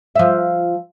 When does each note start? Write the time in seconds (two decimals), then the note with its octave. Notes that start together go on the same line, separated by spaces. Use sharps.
0.15 F3 E5